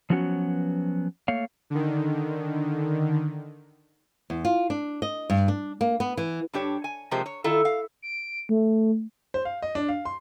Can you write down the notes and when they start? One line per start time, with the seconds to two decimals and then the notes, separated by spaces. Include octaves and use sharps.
0.10 F3 F#3 B3 C#4 F#4 B4
1.28 A3 A#3 C#5 F5
1.70 D3 D#3
4.30 E2
4.45 F4
4.70 D4
5.02 D#5
5.30 G2
5.48 D4
5.81 A#3
6.00 B3
6.17 E3
6.53 G2 D4 G4 C#5
6.84 G#5
7.11 C3 F3 G#3 A#3 G4 C5
7.26 C#5
7.44 D#3 E4 F4 A4
7.65 F5
8.02 D7
8.49 A3
9.34 C5
9.45 F5
9.62 D#5
9.75 D4
9.89 F5
10.05 C6